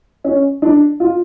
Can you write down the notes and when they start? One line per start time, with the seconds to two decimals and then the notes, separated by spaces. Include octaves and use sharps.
0.24 C#4
0.62 D4
1.00 F4